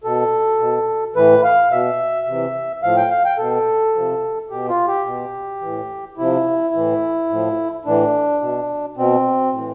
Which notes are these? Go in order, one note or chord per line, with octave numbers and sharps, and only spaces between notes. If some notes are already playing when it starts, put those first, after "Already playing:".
B2 A4
B2
A2 E3 B4
F5
B2 E5
C3 E3
A2 F3 F5
G5
F5
G5
B2 A4
C3 F3
B2 G4
F4
G4
B2
A2 E3
C3 F3 E4
A2 E3
A2 F3
A2 E3 D4
B2
B2 C4
A2 E3